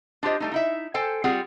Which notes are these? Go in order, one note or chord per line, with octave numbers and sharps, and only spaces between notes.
D4 F4 G4 C5 D#5
G3 A3 D#4
D#4 E4 E5
A4 C5 G5 G#5
G3 C4 F4 G#4 F#5